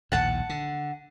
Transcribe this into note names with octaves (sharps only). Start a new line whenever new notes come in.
A#1 D#2 A2 F#5 A5
D3